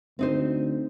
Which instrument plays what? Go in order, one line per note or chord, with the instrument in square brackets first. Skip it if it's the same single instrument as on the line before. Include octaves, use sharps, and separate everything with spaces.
[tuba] D2 [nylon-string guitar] C4 D#4 C5